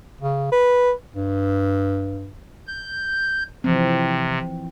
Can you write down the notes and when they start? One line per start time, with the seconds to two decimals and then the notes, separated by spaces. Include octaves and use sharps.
0.21 C#3
0.52 B4
1.15 G2
2.67 G6
3.64 C3 E3 F3 C4